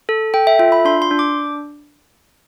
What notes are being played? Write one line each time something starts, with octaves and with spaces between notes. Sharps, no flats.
A4
A4 G5
E5
F4 E5
B5
D4 C6
C6
D4
D6